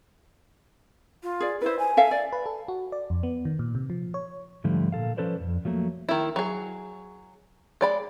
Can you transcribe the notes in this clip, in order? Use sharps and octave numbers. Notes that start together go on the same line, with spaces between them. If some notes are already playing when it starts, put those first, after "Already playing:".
F4
G#4 D5
E4 B4 C5
G#5
A4 E5 F5
D5
B4
A4
F#4
D5
F2
B3
D#3
A#2
C3
F3
C#5
G#2 D3 F3 G3 A3
A#2 A4 F5
F3 C#4 A4 B4 C5 D5
F2
F3 F#3 A3 A#3
D#3 E4
F#3 G#4
G#3 D5 B5